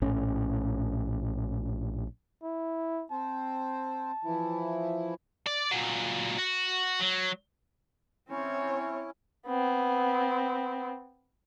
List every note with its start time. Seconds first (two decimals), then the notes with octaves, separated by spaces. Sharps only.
0.02 A#1 A2 C#4
2.43 E4
3.11 C4 C5 A5
4.25 E3 F3 E4
5.47 D5
5.71 A#2 F#3
6.39 F#4
7.00 F#3
8.30 C4 C#4 E4 C#5
9.47 B3 C4